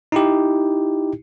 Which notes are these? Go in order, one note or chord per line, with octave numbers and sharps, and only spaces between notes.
D#4 E4 G4